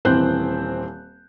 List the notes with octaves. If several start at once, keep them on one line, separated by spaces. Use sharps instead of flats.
D#1 E3 C4 C5 F#6 G6